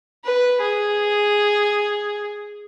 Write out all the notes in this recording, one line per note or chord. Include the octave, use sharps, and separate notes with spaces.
B4
G#4